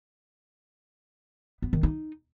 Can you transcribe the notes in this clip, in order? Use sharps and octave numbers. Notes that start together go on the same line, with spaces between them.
B3
D#3
D#4